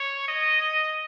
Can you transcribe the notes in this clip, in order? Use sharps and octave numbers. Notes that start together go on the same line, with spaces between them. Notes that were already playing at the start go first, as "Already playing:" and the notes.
Already playing: C#5
D#5